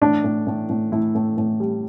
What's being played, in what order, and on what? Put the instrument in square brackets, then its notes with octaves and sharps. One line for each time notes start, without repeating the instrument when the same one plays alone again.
[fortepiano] A2 D4
A2
A2
A2
A2 E4
A2
A2
G3